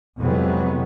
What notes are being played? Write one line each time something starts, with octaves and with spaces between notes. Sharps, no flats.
F2 C3 E3 F#3 G#3 B3